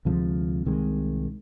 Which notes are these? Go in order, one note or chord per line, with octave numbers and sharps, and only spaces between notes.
D2 C3 F3 G#3
C2 C3 D#3 G#3